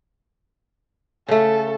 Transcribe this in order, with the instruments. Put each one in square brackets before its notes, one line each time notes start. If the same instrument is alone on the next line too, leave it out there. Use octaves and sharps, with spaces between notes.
[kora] C#3 A3 [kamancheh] A4